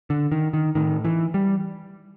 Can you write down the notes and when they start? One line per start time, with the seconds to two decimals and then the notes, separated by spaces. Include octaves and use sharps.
0.10 D3
0.32 D#3
0.54 D#3
0.75 A2 D#3
1.05 E3
1.34 G3